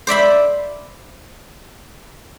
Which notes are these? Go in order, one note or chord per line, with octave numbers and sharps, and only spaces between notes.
C5 D5 E5 B5